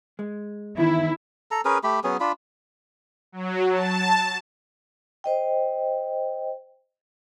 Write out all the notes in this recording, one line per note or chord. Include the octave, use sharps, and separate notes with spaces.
G#3
E2 D#3 E4
A4 A#5
C#4 G#4 A#4 B4
A3 G4 B5
F#3 B3 C#4 G#4
D4 F4 B5
F#3
A5
C5 D#5 G5